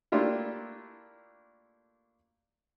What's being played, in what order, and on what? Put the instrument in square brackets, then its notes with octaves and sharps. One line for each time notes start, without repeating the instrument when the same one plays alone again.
[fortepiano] A3 A#3 D4 E4 F4 G4